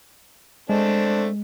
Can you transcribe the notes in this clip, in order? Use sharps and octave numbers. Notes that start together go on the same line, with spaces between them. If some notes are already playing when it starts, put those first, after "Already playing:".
G#3 A3 C4 D4